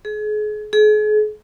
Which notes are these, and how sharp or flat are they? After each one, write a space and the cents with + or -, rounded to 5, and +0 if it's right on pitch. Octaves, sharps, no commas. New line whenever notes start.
G#4 +35
G#4 +40